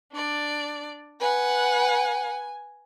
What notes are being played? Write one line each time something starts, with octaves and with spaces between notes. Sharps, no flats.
D4 D5
B4 F#5 G#5